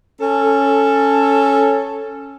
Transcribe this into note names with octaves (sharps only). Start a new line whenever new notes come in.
C#4 A4